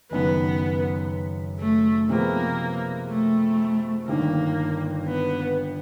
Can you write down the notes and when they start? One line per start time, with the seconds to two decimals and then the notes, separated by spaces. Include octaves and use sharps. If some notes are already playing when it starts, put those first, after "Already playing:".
0.11 F#1 F#2 D#3 B3
1.59 A3
2.10 C3 F3 G#3 A#3 B3
3.09 A3
4.07 G1 G2 D#3 A#3
5.07 B3